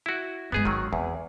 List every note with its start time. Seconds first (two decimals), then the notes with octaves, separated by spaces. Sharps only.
0.06 E4 F#4
0.52 G2 G#3 B3 G#4
0.65 G#1 D#3 F#3
0.93 E2 C4